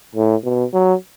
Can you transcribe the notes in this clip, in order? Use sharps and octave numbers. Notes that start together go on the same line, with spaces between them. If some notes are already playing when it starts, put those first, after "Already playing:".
A2
B2
F#3